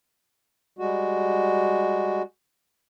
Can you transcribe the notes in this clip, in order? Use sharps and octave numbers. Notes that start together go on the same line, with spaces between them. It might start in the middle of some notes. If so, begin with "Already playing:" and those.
G3 G#3 F#4